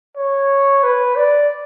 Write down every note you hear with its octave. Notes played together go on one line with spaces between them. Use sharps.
C#5
B4
D5